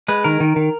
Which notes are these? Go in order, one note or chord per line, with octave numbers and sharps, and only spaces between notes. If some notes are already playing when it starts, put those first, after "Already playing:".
G#3 B4
D#3 A#4
D#3
D#3